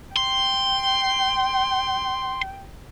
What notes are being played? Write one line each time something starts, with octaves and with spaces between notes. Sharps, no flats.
G5 C6